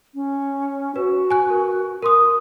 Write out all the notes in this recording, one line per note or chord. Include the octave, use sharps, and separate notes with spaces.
C#4
F#4 B4
G#5 F#6
A#4
A#4 C6 D#6